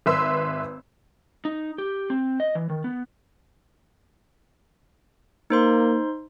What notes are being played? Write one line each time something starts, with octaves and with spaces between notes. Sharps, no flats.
G#1 B4 E5 C6 E6
D#4
G4
C4
D#5
E3
D#3
B3
A#3 D#4 C5 C6